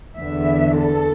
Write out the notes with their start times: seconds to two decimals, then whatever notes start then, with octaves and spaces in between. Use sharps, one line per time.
0.18 E2 D3 B3 E5
0.77 A4